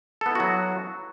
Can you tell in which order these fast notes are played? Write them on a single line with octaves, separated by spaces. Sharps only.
A4 B3 E4 F#4 F#3